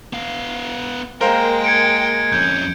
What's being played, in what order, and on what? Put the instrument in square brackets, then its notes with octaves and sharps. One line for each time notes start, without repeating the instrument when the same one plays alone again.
[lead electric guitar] B3 F5
[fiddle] G#3 A#3 [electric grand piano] A#4 C5 F5 [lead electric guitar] G5
[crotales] G#6 C#7 D7
[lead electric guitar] F2 C#4 [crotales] G6